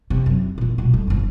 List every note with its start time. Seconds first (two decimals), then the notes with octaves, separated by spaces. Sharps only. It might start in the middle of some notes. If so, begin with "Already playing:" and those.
0.10 C3
0.26 F#2
0.58 A#1 F4
0.78 B2 G#3
0.93 G3 A3
1.07 G1 G2